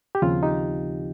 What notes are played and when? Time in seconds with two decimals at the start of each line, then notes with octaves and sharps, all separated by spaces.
0.15 G4
0.22 D#2 C#3 F3 C4 F4
0.43 D#4 G4